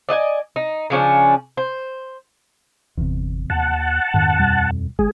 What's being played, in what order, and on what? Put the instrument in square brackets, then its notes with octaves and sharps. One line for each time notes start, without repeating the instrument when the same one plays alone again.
[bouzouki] D5 D#5 F#5 G#5
D#4
C#3 F3 C#4 D4
C5
[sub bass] G1 [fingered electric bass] E2 C3
[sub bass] D#2 [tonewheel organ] F#5 A5
[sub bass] F2 [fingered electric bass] G#2 D#3
[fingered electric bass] D#2 B2 G3
[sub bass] G1 [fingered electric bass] G#3 [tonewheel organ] G#4